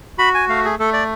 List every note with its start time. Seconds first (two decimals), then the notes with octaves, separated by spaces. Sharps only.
0.18 F#4 B5
0.34 G#5
0.48 A3 F5
0.64 G#4
0.79 A3 A4
0.93 D5